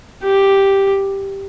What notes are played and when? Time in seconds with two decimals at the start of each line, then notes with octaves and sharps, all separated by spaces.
0.23 G4